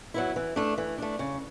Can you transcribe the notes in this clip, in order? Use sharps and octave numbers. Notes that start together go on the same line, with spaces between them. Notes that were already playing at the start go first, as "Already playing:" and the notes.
F#3 B3 E4
E3
A3 D4
E3
A3 D4
C#3